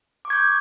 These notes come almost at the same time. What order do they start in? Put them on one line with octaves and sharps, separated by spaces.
D6 C#6 G#6 G6